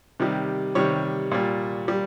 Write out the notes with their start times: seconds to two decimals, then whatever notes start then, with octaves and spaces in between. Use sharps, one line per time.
0.20 C3 D#3 G3
0.75 C3 D#3 G3 C#5
1.31 A#2 G3
1.88 G3